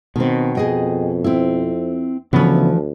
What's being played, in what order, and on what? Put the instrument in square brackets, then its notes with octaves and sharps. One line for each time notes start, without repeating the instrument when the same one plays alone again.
[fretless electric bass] B2 [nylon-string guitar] D#3 C4
[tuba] F2 [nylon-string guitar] G#4 D#5 G5
[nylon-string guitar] C4 E4
[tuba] D2 [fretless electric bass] C#3 B3 [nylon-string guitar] E3 F3